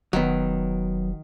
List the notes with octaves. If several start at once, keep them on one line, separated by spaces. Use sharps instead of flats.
F1 D#3 F#3 B3